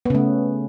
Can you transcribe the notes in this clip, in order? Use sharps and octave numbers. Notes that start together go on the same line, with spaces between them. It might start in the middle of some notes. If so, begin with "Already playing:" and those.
C#3 A3 B3